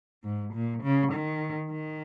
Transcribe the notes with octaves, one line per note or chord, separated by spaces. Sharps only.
G#2
A#2
C#3
D#3
D#3